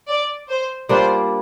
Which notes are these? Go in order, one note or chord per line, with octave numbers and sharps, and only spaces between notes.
D5
C5
G3 A#3 D4 F4 C5